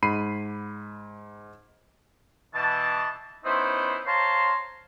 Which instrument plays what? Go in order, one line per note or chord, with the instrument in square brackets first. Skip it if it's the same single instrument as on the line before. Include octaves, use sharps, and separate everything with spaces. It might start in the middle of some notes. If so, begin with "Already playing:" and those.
[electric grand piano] G#2 B5 C7 D#7
[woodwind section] B2 E3 A5
B3 C#4 D#4 E4 C5
C5 C#5 F5 A5 A#5 C6